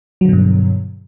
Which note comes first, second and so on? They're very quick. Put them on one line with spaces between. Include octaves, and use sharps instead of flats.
F#3 D3 B2 G2